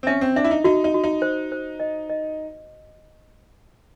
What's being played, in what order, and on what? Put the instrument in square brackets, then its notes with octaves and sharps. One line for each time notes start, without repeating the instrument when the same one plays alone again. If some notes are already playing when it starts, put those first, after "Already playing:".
[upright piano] C4
[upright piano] C#4 [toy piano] E5
[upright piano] C4
[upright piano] D4 [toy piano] E5
[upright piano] E4
D#4
[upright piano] D#4 [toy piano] F#4
[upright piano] D#4
[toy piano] F#4
[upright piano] D#4
[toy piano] C5
C5
D#5
D#5